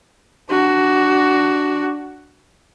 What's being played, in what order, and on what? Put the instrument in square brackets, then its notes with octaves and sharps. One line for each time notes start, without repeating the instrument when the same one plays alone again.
[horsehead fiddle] D4 F#4